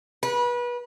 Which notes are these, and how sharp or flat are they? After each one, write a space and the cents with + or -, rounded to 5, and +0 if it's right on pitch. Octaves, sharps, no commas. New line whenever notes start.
B4 -30